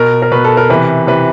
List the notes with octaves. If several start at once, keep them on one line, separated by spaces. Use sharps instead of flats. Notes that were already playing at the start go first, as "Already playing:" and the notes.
Already playing: B2 A#4
A#4
B2 B4
A4
A#4
C3 E3 B4
C3 E3 B4